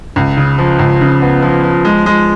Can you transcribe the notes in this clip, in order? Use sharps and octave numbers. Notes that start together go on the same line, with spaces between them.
C#2
C#3
F3
C#2
C#3
B3
F3
F3
G#3
G#3